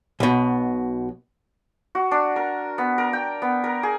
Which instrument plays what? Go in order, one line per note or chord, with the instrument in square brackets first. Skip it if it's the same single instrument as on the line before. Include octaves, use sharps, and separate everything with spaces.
[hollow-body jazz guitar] B1 B2
[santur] F#4
D4
A#4
B3
A#4
G5
B3
A#4
G#4